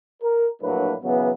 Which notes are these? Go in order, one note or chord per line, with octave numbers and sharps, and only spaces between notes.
A#4
A#1 A2 F#3 A#3 D4 B4
C#3 E3 F#3 B3